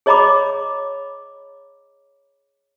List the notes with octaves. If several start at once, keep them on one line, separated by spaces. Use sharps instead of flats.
G#4 C#5 D#5 A#5 B5 D6